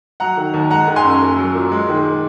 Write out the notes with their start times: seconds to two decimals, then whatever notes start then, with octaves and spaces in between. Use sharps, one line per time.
0.20 F#3 F#5 A#5
0.37 D#3
0.54 D#2
0.71 G#3 F#5 A#5
0.87 D#3
0.96 G#5 C6
1.04 F#2
1.22 A#3
1.38 F#3
1.55 A#2
1.72 G#3
1.89 D#3